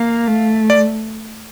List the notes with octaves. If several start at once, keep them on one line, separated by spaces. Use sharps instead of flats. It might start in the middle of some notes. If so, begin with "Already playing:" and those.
Already playing: A#3 F5
A3
D5